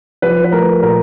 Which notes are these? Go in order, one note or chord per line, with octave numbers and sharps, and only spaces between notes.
F3 B4
B4
A3 A#4
A#2 A#4